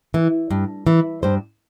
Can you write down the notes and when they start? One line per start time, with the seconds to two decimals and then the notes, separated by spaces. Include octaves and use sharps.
0.14 E3
0.51 G2
0.87 E3
1.23 G2 C5